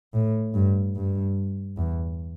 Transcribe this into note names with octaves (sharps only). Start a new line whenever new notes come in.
A2
G2
G2
E2